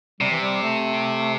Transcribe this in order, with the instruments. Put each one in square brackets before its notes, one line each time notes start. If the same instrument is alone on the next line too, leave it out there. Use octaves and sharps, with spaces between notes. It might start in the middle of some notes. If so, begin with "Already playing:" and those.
[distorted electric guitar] C3 [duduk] G3
[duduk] E3
G3
A3